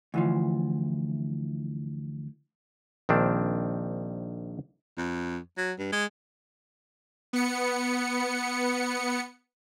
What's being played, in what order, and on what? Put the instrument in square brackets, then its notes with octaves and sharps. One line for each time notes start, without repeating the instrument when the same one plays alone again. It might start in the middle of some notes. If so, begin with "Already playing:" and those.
[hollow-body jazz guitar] D2 E3 F3
[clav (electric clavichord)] A#1 D#3 C4 D4
[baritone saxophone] F2
F#3
G2
G#3
[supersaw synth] B3 C#7